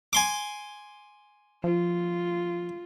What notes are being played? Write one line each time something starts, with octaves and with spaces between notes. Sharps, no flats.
G#5 C6 D6
F3 F4